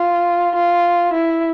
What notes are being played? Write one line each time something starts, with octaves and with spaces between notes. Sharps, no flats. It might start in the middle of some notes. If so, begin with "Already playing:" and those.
Already playing: F4
F4
E4